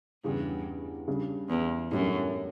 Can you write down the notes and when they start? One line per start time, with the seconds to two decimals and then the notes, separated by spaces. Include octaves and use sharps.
0.24 E2 G2 C#3 G3
1.08 C#3 G3 D4
1.49 E2
1.91 F#2 A2 G3 D4